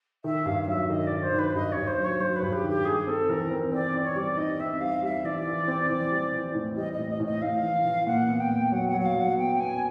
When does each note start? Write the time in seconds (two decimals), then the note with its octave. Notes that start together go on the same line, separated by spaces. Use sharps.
0.24 D#3 E5
0.45 G2 F5
0.62 F5
0.68 F#3 E5
0.89 D#3 D#5
1.06 D5
1.11 D#3
1.22 C5
1.33 D#3 B4
1.54 G2 D#5
1.71 C#5
1.77 G2
1.87 C5
1.98 F#3
2.04 C#5
2.20 F#3 C5
2.36 B4
2.42 G2
2.52 G4
2.64 D#3
2.69 G4
2.84 G3 G#4
3.07 C4 A4
3.29 E3 A#4
3.50 C4
3.72 C4 D5
3.93 C4
4.03 C#5
4.16 G3 D5
4.37 D#4 D#5
4.59 C4 E5
4.80 G3 F5
5.02 G3 E5
5.24 E3 D5
5.46 E3
5.68 C4
5.89 E3
6.11 G3
6.33 E3
6.55 A2
6.76 G3 D#5
6.92 D#5
6.98 A2
7.09 D#5
7.20 A2
7.25 D#5
7.41 A2 F5
7.63 E3
7.85 E3
8.06 A#2 F#5
8.28 B3
8.39 G5
8.50 A#2
8.72 F#3 F#5
8.88 F#5
8.94 F#3
9.00 F#5
9.05 F5
9.15 F#3
9.20 F#5
9.37 B3 G5
9.59 B3 G#5